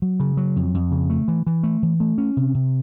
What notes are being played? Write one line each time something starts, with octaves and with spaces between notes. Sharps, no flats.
F#3
C#3
F#3
F2
F2
C#3
A3
E3
E3
A3
E3
A3
C#4
C3
C3